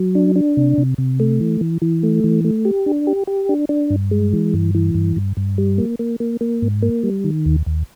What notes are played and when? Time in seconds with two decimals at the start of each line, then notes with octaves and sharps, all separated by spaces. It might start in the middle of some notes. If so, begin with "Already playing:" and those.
Already playing: F#3
0.15 D4
0.36 D4
0.57 C3
0.78 C3
0.98 C3
1.20 A3
1.41 E3
1.61 E3
1.82 E3
2.03 A3
2.24 E3
2.44 A3
2.65 G4
2.86 D4
3.07 G4
3.27 G4
3.49 D4
3.69 D4
3.90 G2
4.11 G#3
4.33 E3
4.54 G2
4.75 E3
4.95 G2
5.16 G2
5.37 G2
5.58 G3
5.78 A#3
5.99 A#3
6.20 A#3
6.41 A#3
6.62 G#2
6.83 A#3
7.03 G3
7.24 D#3
7.46 D#2
7.66 D#2